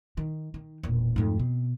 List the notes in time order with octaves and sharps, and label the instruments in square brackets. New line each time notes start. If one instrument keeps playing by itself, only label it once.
[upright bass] D#3
D#3
E1 A#2
[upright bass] F2 D#4 [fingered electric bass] G#2 A3
[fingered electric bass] B2 [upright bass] C4